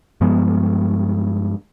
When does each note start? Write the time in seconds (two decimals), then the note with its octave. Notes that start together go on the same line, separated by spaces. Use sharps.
0.21 G2 F3 G#3 B3